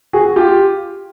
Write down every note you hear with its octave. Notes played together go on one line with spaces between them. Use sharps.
F#4 G#4
F4 G4